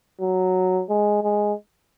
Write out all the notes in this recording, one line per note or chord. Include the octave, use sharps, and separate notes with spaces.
F#3
G#3
G#3